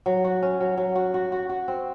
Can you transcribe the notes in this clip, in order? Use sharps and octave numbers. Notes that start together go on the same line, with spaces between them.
F#3
F#4
C#4
F#3
F#3
F#4
F#4
F#4
F#4
C4